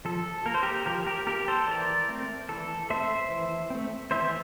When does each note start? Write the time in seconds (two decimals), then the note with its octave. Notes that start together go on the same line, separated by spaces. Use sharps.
0.05 F3 A4
0.46 A#3 A#4
0.54 C5
0.63 G4 A#4
0.86 F3 G4 A#4
1.06 G4 A#4
1.27 A#3 G4 A#4
1.48 A4 C5
1.67 E3 A#4 D5
2.09 A3 C4
2.48 E3 A4
2.90 A3 C4 C5 E5
3.30 E3
3.70 A3 C4
4.11 E3 C5 E5